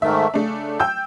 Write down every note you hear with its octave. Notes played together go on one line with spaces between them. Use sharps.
G#2 D#3 A3 E5
C#3 A3 D4
G5 E6 G6